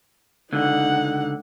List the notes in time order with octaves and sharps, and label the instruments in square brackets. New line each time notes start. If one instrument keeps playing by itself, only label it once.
[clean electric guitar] C#2 D3 [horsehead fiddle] D#4 F#5